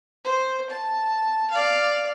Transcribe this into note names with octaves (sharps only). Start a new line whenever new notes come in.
C5
A5
D5 F5